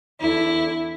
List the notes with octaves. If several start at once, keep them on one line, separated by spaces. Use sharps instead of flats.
E2 D3 E4